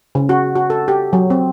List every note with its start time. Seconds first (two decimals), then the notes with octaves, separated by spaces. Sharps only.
0.15 C#3
0.29 F#4
0.55 F#4
0.70 A4
0.88 G4
1.13 F#3
1.30 C4